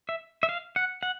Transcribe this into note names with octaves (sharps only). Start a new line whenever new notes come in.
E5
E5
F5
F#5
F#5